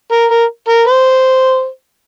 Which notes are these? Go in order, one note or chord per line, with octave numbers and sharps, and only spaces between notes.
A#4
A#4
A#4
C5